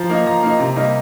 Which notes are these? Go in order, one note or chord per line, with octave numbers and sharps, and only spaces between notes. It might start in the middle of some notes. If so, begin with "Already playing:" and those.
Already playing: F3 A#5
A#3 D#4
F3 A#5
A#3 D#4
C3
G3 A#3 D#4